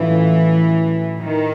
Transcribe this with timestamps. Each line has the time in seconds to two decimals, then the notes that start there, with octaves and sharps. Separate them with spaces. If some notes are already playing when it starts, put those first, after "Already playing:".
Already playing: A2 E3 F#3 A3 C#4 F4
1.19 D#3